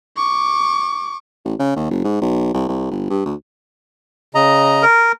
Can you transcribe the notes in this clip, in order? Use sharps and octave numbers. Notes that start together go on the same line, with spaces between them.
C#6 D6
A1
C#3
D#2
F#1
G#2
B1
C2
C2
G1
G2
D2
C#3 D#5 A#5
A#4